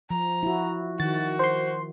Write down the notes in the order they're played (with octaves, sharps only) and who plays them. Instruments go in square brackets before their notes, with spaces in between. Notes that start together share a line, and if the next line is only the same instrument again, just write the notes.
[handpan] F3 [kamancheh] A#5
[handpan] E4 F#4
[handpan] D#3 [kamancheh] F#4 [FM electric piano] A6
[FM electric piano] C5 C6